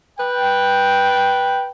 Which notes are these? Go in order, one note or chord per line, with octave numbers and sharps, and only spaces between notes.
B4 G5